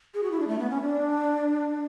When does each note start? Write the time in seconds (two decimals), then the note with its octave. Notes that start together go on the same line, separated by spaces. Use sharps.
0.14 G#4
0.23 F#4
0.31 E4
0.40 D4
0.47 A3
0.59 B3
0.70 C#4
0.81 D4